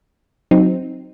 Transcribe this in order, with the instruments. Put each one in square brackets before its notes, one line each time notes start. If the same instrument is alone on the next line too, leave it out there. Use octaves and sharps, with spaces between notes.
[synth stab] F#3 C4 D#4